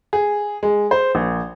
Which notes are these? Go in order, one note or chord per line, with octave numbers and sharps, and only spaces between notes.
G#4
G#3
C5
A#1